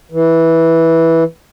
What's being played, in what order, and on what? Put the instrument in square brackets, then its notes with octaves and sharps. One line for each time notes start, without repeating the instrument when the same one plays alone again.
[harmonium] E3